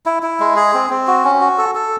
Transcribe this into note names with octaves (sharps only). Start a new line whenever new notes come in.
E4
E4
G#3
G#4
C4
C4
F#4
C#4
F#4
A4
A4